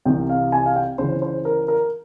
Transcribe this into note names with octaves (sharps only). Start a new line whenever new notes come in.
C2 C3 E3 G5
F5
G#5
F5
G5
C#2 C#3 E3 C5
C5
A#4
A#4